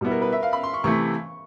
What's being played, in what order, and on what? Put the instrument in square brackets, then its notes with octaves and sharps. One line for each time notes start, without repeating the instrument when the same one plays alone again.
[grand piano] B2 G3 B3 E4
[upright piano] A#4
B4
E5
F5
B5
C6
C#6
[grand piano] C3 E3 A3 [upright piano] C#6